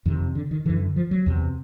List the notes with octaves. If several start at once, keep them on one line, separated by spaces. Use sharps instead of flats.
F2 C3 D#3
D3
D#3
F#2 D3 E3
F3
F#3
E2 C3